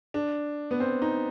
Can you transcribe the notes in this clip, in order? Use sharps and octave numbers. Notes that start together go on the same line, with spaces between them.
D4
B3
C4
D#4